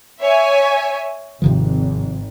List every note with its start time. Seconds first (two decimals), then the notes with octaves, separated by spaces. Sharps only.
0.21 C#5 E5 G#5
1.42 G#1 C3 D#3 F3